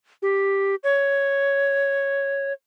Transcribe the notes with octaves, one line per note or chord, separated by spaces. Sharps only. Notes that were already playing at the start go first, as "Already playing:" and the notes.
G4
C#5